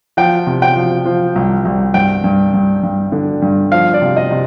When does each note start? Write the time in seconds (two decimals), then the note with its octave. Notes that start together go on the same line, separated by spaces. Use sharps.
0.17 F3 G5
0.47 C3
0.62 G5
0.76 F3
1.06 F3
1.36 C2
1.65 C2
1.94 G2 G5
2.24 G2
2.54 G2
2.83 G2
3.12 D3
3.42 G2
3.72 F3 F5
3.94 D5
4.02 C3
4.17 D#5
4.31 C3